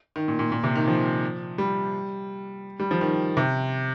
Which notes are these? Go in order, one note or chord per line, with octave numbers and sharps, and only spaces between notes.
D#3
A#2
A#2
A#2
C3
D#3
F3
G3
G3
F3
D#3
C3